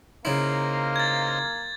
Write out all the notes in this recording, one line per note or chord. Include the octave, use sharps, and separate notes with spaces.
C#3 A#3 D#4 E4 C5 F5
G#6 A6